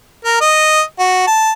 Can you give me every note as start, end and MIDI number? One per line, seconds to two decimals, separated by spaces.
0.25 0.36 70
0.41 0.81 75
0.99 1.23 66
1.27 1.52 81